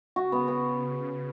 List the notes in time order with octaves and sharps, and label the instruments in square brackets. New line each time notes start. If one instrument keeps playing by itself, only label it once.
[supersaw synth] C#3 [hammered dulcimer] F#4
[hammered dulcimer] B3
B3